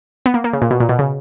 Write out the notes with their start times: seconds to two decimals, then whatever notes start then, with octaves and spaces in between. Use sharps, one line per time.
0.26 B3
0.34 A#3
0.44 A#3
0.53 C#3
0.62 A#2
0.71 B2
0.80 A#2
0.89 B2
0.99 C#3